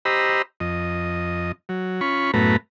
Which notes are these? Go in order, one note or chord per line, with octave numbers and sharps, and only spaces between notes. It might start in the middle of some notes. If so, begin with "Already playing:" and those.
G4 C5 D#5 A#5 B5 E6
F2 D#5
F#3
C#4 F4 B5 C#6
F#2 A2 A3 B3 B4 A#5